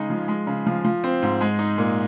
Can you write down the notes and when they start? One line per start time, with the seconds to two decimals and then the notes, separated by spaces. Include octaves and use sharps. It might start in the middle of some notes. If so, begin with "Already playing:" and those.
Already playing: C#3 G#3 D#4
0.10 F3
0.28 G#3
0.47 C#3
0.66 F3
0.85 F3
1.04 C4
1.22 G#2
1.41 G#3
1.59 D#4
1.78 A#2